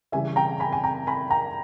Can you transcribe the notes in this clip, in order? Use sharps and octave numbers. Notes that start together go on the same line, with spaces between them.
C#3 E3 G3 E5 G#5
G5 A#5
G#5 B5
G#5
G5 A#5
G#5 B5
G5 A#5